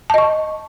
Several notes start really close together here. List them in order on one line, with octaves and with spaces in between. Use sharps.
A5 D#5 C#6